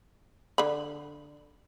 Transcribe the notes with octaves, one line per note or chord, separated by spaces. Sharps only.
D3 B5